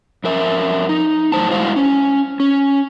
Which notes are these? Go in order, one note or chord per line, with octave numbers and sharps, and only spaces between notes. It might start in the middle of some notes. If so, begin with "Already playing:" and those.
F2 A#4 E5
D#4
F#2 A2 C5 A5
G3 G#3 E4 F#4 C5 F5
C#4
C#4